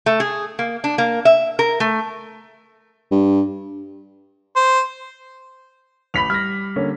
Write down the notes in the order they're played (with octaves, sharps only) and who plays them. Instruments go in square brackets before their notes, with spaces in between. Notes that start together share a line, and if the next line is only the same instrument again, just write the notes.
[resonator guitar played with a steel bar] A3
G#4
A#3
D4
A#3
E5
A#4
A3
[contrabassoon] G2
[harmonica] C5
[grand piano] A1 [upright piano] B5 B6 F7
[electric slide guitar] G3 [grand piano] F6 A#6
[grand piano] D3 A#3 C#4